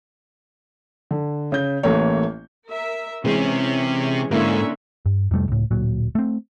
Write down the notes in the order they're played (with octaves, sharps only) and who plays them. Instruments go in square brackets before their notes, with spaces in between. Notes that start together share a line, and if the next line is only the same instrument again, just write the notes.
[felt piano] D3
C#3 G6
A1 E3 A3 A#3 C#5
[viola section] A#4 E5
[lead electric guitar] C3 C4 [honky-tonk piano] E3 G#3 [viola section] C#4
[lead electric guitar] G#2 [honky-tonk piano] D3 A#3 E4 [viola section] C#4 C#5 E5
[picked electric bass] G2
F2 C3 G3 A3
C#2 A2
D1 A#2 F#3
A3 C4